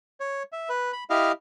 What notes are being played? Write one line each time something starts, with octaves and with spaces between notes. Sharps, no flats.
C#5
E5
B4
B5
E4 G4 D#5 F5